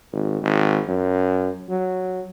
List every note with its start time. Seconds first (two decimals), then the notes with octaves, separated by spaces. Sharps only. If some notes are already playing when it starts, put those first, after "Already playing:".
0.12 G#1
0.42 G#1
0.87 F#2
1.69 F#3